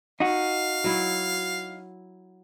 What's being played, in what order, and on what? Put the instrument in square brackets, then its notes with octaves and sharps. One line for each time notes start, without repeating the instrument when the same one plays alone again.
[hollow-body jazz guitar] D#4 F#4 [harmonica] F5
[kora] F#3 E4